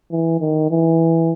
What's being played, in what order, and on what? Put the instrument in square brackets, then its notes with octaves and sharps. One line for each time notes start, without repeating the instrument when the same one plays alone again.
[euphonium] E3
D#3
E3